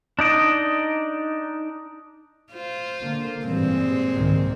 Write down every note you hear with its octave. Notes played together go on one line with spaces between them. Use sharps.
D4 D#4 D5 D#5
F4 C5
D3 A#3
G2 A#2 E3 G3 G#3 C4
C2 G#2 D#3